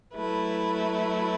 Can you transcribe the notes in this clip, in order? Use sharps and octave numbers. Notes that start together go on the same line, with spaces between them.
F#3 A3 E4 B4